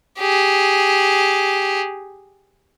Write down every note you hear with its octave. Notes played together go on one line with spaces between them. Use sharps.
G4 G#4